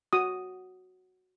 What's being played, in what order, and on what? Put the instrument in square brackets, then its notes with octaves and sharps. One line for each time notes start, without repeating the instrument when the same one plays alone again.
[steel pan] F#4 D#6